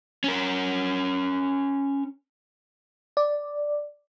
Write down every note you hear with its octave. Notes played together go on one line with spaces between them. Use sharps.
C#4 A#4
D5